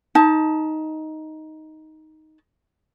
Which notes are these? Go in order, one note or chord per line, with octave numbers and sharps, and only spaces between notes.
D#4 A5